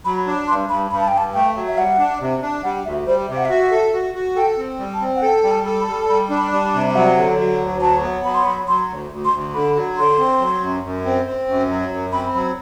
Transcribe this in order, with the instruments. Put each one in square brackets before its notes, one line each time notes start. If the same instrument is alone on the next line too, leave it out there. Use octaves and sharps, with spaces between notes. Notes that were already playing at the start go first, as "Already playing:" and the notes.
[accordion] F#3 [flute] B5
[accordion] D4
[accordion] G2 [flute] C6
[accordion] G2 [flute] B5
[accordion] G2 [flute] B5
[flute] A5
G5
[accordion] G2
[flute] A5
[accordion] A3 [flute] G5
[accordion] F#3
[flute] E5
[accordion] G3 [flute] F#5
[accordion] D4
C3
D4
[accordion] G3 [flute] F#5
[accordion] D2 [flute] E5
[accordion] G3 [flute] C5
[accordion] C3 [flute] E5
[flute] F#5
[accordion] F#4 [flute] E5
[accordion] A4
F#4
F#4
[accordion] A4 [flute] G5
[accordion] C4
G3
[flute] A5
[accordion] C4
[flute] F#5
[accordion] A4 [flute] G5
[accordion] G3 [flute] G5
[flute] A5
[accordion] A4
[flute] B5
[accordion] G3
[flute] A5
[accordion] G3 [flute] B5
[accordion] D4
[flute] B5
[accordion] G3
[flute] A5
[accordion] C3
[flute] E5
[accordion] F#3 [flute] F#5
[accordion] D3
F#3
D2
[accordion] F#3 [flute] A5
[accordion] B3
[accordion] F#3 [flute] B5
[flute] C6
[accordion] F#3 [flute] B5
[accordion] F#3 [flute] C6
[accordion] D2
D2
[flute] C6
[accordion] D2
[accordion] D3 [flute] B5
[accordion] F#3
[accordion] D3 [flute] C6
[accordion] C4
F#3
F#2
F#2
C4
C4
F#2
F#3
F#2
[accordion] C4 [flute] B5
[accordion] F#3 [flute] B5